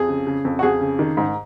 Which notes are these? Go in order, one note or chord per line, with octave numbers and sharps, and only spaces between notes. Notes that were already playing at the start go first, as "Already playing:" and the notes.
Already playing: F2 G#4
C#3
C#3
F2
F#4
F2 G#4
C#3
D#3
G#2